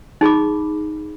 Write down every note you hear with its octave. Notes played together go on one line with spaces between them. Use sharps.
D#4 G#4 B5 D6